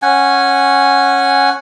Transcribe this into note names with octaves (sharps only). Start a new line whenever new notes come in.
C#4 F#5 G#5